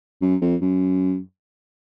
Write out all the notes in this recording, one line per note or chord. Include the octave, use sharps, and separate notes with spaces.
F#2
F2
F#2